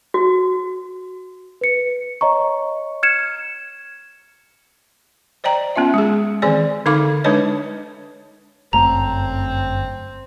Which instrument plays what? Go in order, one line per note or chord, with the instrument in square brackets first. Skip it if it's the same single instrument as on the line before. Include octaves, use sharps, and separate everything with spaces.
[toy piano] F#4
[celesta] B4 C#7
C#5 D#5 A#5 C#6
F6 G#6 C#7 E7
[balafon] C5 D5 D#5 G5 A#5
B3 C#4 F4 E5
G#3 G#4
D#3 E3 C4 G#4 D5 G#5
D3 D#4 A4 F5 D6
G#3 D4 D#4 B4 C#5 D#5
[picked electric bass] G1 F#2 A3 [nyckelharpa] C4 [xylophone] A#5